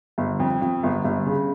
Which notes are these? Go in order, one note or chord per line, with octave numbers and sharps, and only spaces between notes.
G1
F2
F2
G1
G1
C#3